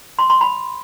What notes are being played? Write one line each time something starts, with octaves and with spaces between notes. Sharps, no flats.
C6
C6
B5